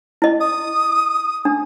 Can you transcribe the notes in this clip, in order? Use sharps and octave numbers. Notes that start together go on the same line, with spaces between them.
E4 D#5
D#6
D4